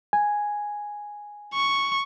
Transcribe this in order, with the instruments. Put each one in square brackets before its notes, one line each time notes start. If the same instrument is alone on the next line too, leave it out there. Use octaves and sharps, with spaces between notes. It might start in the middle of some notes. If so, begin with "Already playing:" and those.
[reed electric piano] G#5
[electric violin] C#6